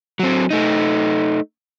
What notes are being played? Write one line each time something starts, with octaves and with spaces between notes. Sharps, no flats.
F#3 C4
A3 D#4